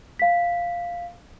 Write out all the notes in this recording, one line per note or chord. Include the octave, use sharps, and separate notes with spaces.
F5 B6